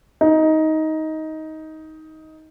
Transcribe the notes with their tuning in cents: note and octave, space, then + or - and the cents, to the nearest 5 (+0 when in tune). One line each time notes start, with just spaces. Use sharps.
D#4 +15